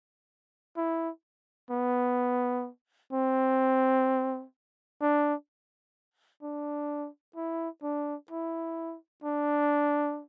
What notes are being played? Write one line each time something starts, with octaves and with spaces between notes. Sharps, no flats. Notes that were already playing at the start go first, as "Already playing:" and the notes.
E4
B3
C4
D4
D4
E4
D4
E4
D4